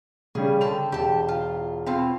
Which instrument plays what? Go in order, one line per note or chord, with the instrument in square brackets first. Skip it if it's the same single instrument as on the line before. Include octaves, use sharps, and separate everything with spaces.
[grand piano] C#3 G3 C#4 [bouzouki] G#4
[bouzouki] D3 G5 A5 [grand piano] F7
[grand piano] E1 [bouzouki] G4 A5
[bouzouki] F4
[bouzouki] B2 F4 F5 [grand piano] C4